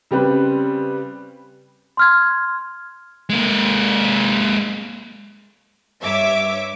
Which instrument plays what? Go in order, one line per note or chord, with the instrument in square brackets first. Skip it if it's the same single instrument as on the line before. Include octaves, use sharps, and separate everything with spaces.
[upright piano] C#3 G3 C4 B4
[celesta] C6 F6 G#6
[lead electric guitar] G#3 A#3
[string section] G2 C#5 E5 D6